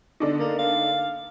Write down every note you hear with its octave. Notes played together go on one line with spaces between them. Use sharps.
D3 D4 D#4
A#3
F5